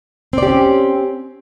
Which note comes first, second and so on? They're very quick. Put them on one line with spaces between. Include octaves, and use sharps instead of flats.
C4 D5 G4 C#4